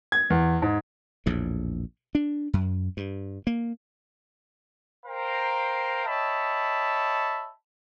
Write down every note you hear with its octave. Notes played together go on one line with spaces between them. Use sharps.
G#6
E2
G#2
A#1 E2 A2
D4
F#2
G2
A#3
A#4 C5 F5 G5 A#5
C#5 D#5 E5 G5 A5 B5